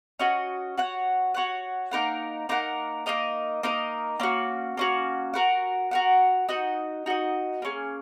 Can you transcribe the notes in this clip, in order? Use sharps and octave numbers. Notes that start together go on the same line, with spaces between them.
C#4 F#4 D#5
F#4 C#5 F#5
F#4 C#5 F#5
A#3 D#4 A#4 F#5
A#3 D#4 A#4 F#5
A#3 D#4 A#4 D#5
A#3 D#4 A#4 D#5
A#3 C#4 F#4
A#3 C#4 F#4
F#4 A#4 F#5
F#4 A#4 F#5
D#4 F#4 D#5
D#4 F#4 D#5
A#3 C#4 G#4